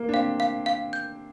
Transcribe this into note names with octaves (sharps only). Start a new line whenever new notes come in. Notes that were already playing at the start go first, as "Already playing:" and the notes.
Already playing: A#3
D4
C4 F5
F5
F5
G6